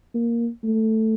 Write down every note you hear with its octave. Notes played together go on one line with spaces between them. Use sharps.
A#3
A3